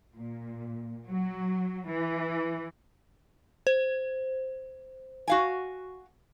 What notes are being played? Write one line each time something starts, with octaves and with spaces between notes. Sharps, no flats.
A#2
F#3
E3
C5
F#4 F5 G#5